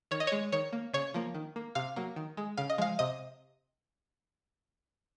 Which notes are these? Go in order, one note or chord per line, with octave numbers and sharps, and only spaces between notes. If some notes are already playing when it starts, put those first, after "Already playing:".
D#3 C#5
D#5
G#3 C#5
D#3 C#5
A#3
C#3 C#5
F3 A#3
D#3
A#3
C3 F5
F#3 A#3
D#3
G#3
C#3 F5
D#5
F3 G#3 F5
C3 D#5